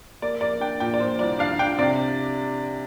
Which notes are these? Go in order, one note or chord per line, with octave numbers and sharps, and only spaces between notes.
A#3 D5
A#3 D5
D4 G5
A#2 G5
D5
A#2 C5
C2 D5
D4 F5
D4 G5
C3 D5